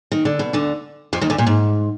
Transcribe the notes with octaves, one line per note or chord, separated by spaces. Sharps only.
D#3
D3
B2
D2 D3
F2 F3
D#2 D#3
D2 D3
A#2
G#2